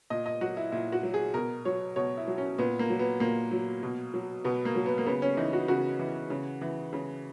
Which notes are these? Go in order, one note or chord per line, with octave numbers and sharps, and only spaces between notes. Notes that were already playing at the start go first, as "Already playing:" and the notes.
A#2 D#5
D#5
F#3 F#4
E4
A#2 E4
F#4
F#3
G#4
B2 A#4
F#3 C#5
B2 C#5
E4
F#3
C#4
A#2 B3
A#3
F#3
B3
A#2 A#3
F#3
B2
F#3
B2 B3
A#3
F#3
B3
A#3
C#3 B3
C#4
E3 D#4
F#4
C#3 F#4
E3
C#3
E3
C#3